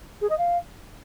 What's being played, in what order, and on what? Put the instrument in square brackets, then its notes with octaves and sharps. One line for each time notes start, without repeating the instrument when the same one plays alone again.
[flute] G#4
D#5
F5